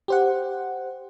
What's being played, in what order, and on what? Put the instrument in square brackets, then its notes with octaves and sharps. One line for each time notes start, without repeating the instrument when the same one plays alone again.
[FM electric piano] G4 C5 F#5